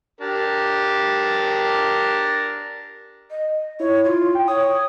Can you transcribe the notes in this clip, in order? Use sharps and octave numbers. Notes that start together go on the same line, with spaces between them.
D4 G4 A#4
D#5
E4 C#5
F4
G5
C#5 D#6